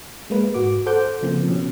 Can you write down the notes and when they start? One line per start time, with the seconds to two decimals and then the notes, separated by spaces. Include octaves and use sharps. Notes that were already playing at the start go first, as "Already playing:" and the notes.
0.30 G#3 A#3 B4
0.54 G#2 F#4 D6
0.86 A4 C5 F#5 D6 G6
1.22 C#3 F3 A#3 C4
1.48 B2 C#4